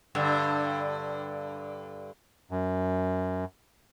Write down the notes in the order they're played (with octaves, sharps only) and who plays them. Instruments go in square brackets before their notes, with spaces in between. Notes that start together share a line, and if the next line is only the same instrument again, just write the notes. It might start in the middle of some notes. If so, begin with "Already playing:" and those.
[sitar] G2 D3
[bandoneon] F#2